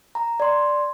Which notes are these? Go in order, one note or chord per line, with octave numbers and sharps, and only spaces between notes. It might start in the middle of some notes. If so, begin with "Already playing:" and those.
A#5
D5 C6